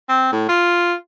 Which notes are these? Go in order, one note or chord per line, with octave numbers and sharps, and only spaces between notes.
C4
A2
F4